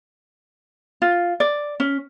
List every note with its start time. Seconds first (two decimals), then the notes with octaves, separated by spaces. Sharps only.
1.02 F4
1.40 D5
1.80 C#4